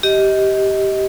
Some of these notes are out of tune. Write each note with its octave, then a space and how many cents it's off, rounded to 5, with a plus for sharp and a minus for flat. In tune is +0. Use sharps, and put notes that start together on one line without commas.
G4 -10 D#5 +20